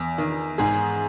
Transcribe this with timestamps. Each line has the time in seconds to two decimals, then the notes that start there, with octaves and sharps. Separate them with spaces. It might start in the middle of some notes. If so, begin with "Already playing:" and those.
Already playing: E2
0.18 D#3
0.58 G#2 G#4